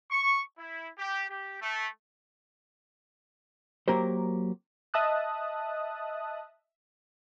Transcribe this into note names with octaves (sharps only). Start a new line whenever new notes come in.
C#6
E4
G4
G4
A3
F#3 A#3 G4 A#4 C5
D#5 E5 A5 D#6 F#6